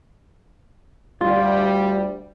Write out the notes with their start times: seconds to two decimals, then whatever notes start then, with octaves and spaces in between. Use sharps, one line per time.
1.21 D2 G3 F4